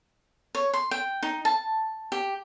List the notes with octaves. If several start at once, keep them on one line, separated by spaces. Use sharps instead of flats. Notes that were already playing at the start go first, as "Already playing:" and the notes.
C#5
C6
G5
D#4
A5
G4